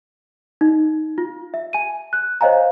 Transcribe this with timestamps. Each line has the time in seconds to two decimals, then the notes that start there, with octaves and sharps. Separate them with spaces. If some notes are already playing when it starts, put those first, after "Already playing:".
0.61 D#4
1.18 F4
1.54 E5
1.73 G#5 D#7
2.13 F#6
2.41 C5 C#5 D#5 F5 G#5 A#5